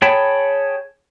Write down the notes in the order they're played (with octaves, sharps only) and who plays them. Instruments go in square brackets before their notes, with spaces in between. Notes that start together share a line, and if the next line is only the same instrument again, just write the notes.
[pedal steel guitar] G#4 C#5 G5 A5 B5